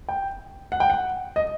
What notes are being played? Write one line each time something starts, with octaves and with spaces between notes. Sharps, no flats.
G5
F#5
G5
F#5
D#5